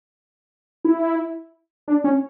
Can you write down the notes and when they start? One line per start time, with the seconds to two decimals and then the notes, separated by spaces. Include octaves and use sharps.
0.85 E4
1.88 D4
2.04 C#4